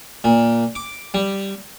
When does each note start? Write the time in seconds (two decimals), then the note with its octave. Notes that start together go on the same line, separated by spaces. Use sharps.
0.24 A#2
0.75 D6
1.14 G3